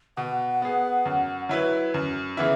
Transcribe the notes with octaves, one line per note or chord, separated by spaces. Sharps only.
B2 F#5
B3 G#4
F#2
F#3 E4 B4
F#2
C#3 E3 B3 E4 E5